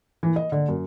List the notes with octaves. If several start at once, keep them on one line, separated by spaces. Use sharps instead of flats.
E3
D#5
D3
F#2